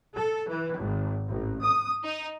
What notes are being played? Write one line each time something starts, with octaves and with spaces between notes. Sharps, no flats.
A4
E3
G#1
A1
D#6
D#4